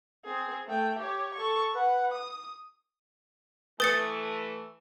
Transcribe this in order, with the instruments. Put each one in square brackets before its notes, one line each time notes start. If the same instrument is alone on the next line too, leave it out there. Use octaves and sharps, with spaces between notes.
[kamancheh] C4 G#4
A3 G5
G4 C#5
A4 C#6
B4 F#5
D#6
[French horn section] E3 A3 [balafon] B4 [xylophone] D#6 A6 C#7